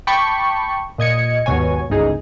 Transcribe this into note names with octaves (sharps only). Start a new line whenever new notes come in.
G5 A5 B5 C#6 D6
A#2 D#5 G#6 C#7
G#1 D#2 B2 C#5 G#5
G1 C#2 D#4 G#4